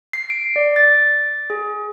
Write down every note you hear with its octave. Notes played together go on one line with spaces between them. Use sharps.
C7
D7
D5
A6
G#4